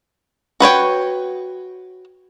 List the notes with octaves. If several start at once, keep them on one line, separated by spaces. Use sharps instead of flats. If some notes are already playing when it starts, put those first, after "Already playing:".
F#4 B4 C#5 G5